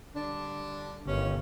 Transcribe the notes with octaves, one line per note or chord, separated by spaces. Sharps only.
D3 G3 D4
G1 A2 D#3 C#4